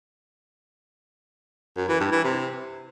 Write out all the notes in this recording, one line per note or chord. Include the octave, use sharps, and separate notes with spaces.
F#2
E3
G2
E3
C3